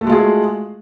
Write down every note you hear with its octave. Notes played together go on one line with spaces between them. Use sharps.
G#3 A3 F4 F#4 G#4